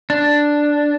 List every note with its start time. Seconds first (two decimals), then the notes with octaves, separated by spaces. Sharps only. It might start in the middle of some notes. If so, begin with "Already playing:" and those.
0.10 D4